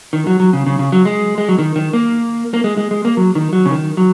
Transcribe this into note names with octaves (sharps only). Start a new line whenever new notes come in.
D#3
F#3
F#3
C#3
C#3
C#3
F#3
G#3
G#3
F#3
D#3
D#3
A#3
A#3
G#3
G#3
G#3
A#3
F#3
D#3
F#3
C#3
D#3
F#3